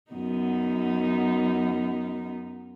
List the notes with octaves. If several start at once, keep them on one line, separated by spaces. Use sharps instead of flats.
F#2 B3 D#4